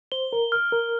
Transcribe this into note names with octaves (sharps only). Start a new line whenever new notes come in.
C5 G7
A#4
F6
A#4